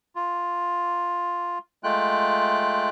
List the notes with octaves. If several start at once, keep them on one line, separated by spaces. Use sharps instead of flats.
F4
G#3 A3 F4 G5 F#6